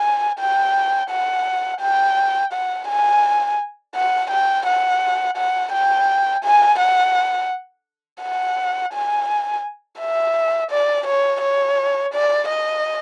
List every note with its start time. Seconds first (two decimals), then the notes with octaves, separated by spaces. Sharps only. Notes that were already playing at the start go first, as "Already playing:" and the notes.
Already playing: G#5
0.39 G5
1.10 F#5
1.81 G5
2.53 F#5
2.88 G#5
3.95 F#5
4.30 G5
4.66 F#5
5.37 F#5
5.73 G5
6.44 G#5
6.79 F#5
8.22 F#5
8.93 G#5
9.99 E5
10.71 D5
11.07 C#5
11.42 C#5
12.13 D5
12.49 D#5